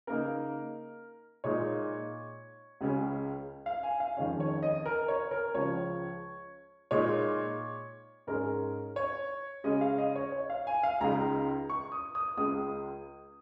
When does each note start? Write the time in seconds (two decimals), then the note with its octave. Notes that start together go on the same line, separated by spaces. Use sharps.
0.07 C#3 A#3 D#4 A#4
1.44 A#2 G#3 D#4 C#5
2.81 C#2 C#3 G#3 C#4
3.66 F5
3.83 G#5
4.00 F5
4.17 F2 D#3 G#3 C#4 C#5
4.40 C#5
4.63 D#5
4.86 A#4
5.08 C#5
5.31 A#4
5.54 C#2 C#3 F3 C#5
6.91 A#2 G#3 D#4 C#5
8.27 G#2 G#3 C#4 A#4
8.96 C#5
9.64 C#3 G#3 C#4 D#5
9.81 F5
9.98 D#5
10.15 C#5
10.32 C#5
10.50 F5
10.67 G#5
10.83 F5
11.01 C#2 C#3 G#3 D#4 A#5
11.69 C#6
11.92 D#6
12.15 D#6
12.37 C#2 C#3 G#3 D#6